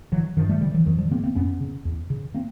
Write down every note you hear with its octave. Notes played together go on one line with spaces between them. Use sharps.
D3 E3 F#3
G2 D#3 F3
G3 A3
D3 F3 G3
E3 F#3
F2 D#3 F3
F3 G3
C#3 A#3 C4
A#3 C4
F2 B3 C#4
C#3
E2
C#3
A#3 C4